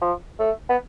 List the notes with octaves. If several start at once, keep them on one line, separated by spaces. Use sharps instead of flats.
F3
A3
B3